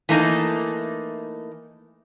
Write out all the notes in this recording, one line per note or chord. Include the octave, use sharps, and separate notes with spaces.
E3 A3 A#3 D#4